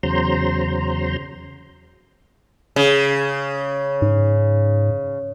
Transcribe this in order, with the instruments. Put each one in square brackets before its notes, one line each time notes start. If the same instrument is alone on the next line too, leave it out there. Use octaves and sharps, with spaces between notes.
[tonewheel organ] E2 C#3 F#3 C5 A#5 C6
[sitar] C#3
[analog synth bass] G#2